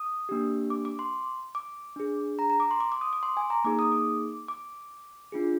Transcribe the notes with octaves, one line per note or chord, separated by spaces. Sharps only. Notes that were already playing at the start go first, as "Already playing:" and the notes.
Already playing: D#6
A#3 D4 G4
D6
D6
C6
D6
D4 G#4
A#5
A#5
D6
C6
D6
D6
D#6
D6
C6
G#5
A#5
A#3 D#4 G#4 D6
D#6
D6
D6
D4 F4 G#4